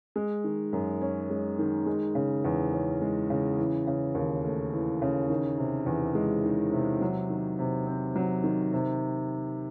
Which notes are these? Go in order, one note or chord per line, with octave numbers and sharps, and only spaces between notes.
G#3
D#3
F#2
C#4
G#3
D#3
G#3
C#3
E2
C#4
G#3
C#3
E3
C#3
D#2
A3
E3
C#3
D#3
C3
E2
G#3
D#3
C3
F#3
D#3
C3
C4
F#3
D#3
C3